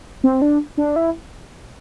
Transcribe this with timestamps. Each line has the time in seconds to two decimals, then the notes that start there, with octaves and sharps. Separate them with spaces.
0.24 C4
0.42 D4
0.78 D4
0.96 E4